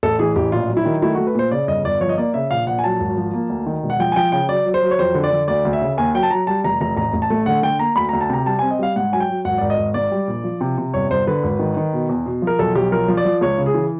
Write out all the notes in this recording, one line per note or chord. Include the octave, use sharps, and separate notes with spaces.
A1 A4
E3 G#4
A1 G4
A#1 F4
F#3
E4
D#3
A3 E4
F#4
A3
B4
A#2 C5
C#3 D5
G1 D#5
G1 D5
F3 C#5
D#5
A#3 D5
C#3 E5
A#1 F5
A#1 F#5
G#5
F#3 A5
G#1
F3
A#3
D2
D#3
E1
F#5
F3 G5
G#5
F3 G5
C#3 G5
F#3 D5
F#3
C5
F#3
C#5
F2 C5
D3
D5
D3
D2 D5
D2
E5
C#3
D#2 G#5
F#3 G5
A5
F#3 A#5
G3 A5
F1 A#5
F1 A#5
A1 A#5
A1
A5
A3
D3 F#5
D3 G5
A#3 A#5
D2 B5
A#5
D2
A5
C3 A#5
G3 A5
C4 G#5
D#5
G3 F5
G#2 F#5
F#3 G#5
G5
F#3
G#1 F#5
G#1 D5
D#5
G#1
G#2 D5
G3
A#1
F3
C3
C3
G1 C#5
G1 C5
D3 B4
G#1
D#3
D#3
B2
E2
B2
F3
A#4
B1 A4
B1 G4
F3 A#4
F3
D5
F3
C#2 C#5
C#3
G#4
E3